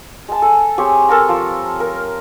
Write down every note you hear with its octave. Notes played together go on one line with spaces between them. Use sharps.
G#3 A5
A4
C4 G4 G#4 C#5
A4 A#4 A5 A#5
F3
A#4